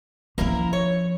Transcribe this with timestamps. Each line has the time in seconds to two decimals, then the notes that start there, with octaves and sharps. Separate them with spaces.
0.38 F3 A#3 C#4 E4 A#4
0.73 C#5